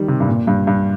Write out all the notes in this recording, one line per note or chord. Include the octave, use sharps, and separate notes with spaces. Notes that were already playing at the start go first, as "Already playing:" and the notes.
Already playing: D#3 G3
C3
G2
A#2
G2
G2